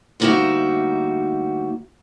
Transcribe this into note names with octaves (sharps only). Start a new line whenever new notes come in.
D2 G3 A#3 D#4 F#4 E5